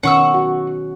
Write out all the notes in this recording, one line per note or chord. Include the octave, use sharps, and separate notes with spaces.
B2 D#3 C#4 F#5 C#6 E6
F#4